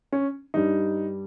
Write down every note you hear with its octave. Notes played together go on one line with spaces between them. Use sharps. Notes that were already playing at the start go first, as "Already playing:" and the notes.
C#4
G2 G3 D#4